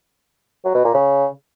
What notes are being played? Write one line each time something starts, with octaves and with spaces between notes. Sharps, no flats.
F#3
B2
A#2
C#3